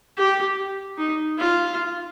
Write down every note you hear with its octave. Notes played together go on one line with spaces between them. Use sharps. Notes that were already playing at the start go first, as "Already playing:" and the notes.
G4
D#4
F4